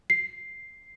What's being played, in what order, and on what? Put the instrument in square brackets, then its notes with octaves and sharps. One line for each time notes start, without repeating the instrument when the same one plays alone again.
[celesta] C7